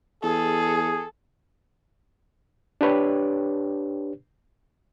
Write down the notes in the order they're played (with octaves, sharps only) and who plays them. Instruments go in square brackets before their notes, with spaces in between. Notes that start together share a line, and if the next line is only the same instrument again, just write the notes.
[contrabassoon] E2 [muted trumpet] G#4 [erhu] A4
[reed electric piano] D4 G4 B4 C#5